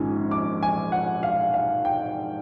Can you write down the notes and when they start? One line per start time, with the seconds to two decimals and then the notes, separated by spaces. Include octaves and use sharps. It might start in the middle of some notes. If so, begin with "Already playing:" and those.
Already playing: A#1 G#2 D#3 G#3 C#4
0.31 D6
0.63 G#5
0.92 F#5
1.23 F5
1.54 F5
1.85 G5